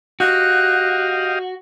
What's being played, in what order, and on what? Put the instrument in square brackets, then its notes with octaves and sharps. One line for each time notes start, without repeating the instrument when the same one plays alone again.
[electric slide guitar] F#4 [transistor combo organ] G4 D#5 F5 [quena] F#6